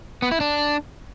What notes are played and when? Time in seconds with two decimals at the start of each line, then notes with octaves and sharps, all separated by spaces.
0.22 B3
0.31 E4
0.41 D4